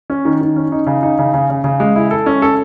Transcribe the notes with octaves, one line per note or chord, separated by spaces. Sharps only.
C#4
D#3
D#3
C#4
D#4
C#3
D#4
C#3
C#3
C#3
C#3
G#3
E4
A4
C#4
A4